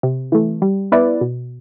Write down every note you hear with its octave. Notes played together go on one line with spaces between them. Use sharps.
C3
E3 A3
G3
B3 E4 B4 D5
B2